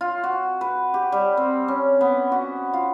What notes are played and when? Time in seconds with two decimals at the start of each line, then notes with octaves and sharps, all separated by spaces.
0.01 F4
0.24 F#4
0.61 B4
0.94 G4
1.12 G3
1.37 C4
1.68 C#4
2.01 B3
2.32 F#4
2.73 F4